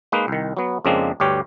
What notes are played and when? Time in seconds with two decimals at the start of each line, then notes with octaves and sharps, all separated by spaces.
0.12 G#3 A#3 D#4 B4
0.28 C2 D#3
0.57 F#3 B3
0.85 F2 C#3 G#3 A#3 C4 D4
1.20 D2 G2 G4 C#5